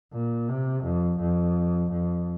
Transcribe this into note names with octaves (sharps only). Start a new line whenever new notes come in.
A#2
C3
F2
F2
F2